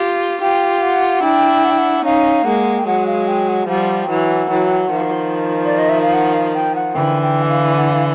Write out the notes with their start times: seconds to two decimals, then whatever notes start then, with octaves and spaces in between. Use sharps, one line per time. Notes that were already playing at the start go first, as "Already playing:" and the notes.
Already playing: F4 G4
0.41 F4 G4 G5
0.83 F#5
1.23 D4 E4 G5
1.65 F#5
1.71 G5
1.78 F#5
2.05 C#4 D#4 F5
2.45 G#3 A#3 F#5
2.78 G5
2.87 F#3 G#3 F#5
3.07 F5
3.28 G5
3.49 F#5
3.68 F3 G3 F#5
4.04 G5
4.09 E3 F#3 F#5
4.50 E3 F#3
4.91 D#3 F3
5.65 D5
5.78 D#5
5.89 E5
6.02 F5
6.13 F#5
6.34 F5
6.55 G5
6.75 F#5
6.95 D3 E3 G5
7.22 G5
7.43 E5
7.50 F5
7.77 F#5
7.92 F5